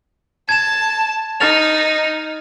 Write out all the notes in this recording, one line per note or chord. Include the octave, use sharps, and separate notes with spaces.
A5 G#6 E7
D#4 F6 A6 F7